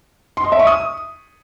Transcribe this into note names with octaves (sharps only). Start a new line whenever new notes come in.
C6
D#5
E5
C#6
D#6